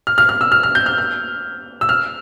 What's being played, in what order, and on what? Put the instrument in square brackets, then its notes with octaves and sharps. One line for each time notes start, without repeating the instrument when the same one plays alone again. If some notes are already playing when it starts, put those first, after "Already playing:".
[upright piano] F6
F6
F6
E6
F6
F6
G6
F6
F6
E6
F6